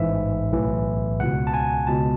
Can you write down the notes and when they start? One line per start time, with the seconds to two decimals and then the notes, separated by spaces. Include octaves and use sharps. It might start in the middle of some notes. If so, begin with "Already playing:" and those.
Already playing: A1 G#2 E3 E5
0.52 B1 A2 E3
1.20 C#2 B2 F#5
1.47 A5
1.54 G#5
1.87 C#2 B2 A5